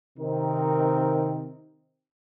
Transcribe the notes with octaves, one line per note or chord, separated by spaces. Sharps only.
C3 D#3 C4 D#4 A#4